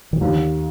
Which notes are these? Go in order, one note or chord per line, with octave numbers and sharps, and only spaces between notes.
D#3
D#2 D3 F3